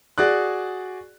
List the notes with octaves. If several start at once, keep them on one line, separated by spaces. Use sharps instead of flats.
F#4 G#4 D5 F#6